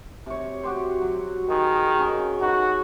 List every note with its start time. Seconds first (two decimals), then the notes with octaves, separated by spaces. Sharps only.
0.26 C3 C#5
0.63 F#4 G4 C5
1.02 F#3
1.50 D#3 G#4
1.99 C#4
2.40 D#4 F#4 B4